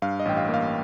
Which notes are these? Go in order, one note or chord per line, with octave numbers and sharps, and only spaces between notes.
G2 F5
D#5
A1 G5
F5
A#3
F5